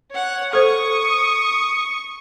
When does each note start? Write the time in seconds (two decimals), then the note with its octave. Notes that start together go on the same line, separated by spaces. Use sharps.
0.11 C#5 F#5
0.53 A4 C5 C#6 D#6